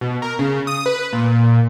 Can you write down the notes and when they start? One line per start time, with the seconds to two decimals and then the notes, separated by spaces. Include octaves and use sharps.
0.01 B2
0.22 A#4
0.39 C#3
0.67 D#6
0.86 B4
1.13 A#2